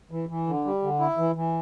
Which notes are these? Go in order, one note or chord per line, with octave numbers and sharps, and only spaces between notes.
E3
E3
D3
G3
D3
E4
E3
E3